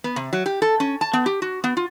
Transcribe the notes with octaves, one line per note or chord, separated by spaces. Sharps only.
B3
C3
F#3
G4
A4
C#4
A5
B3
G4
F#4
B3
F4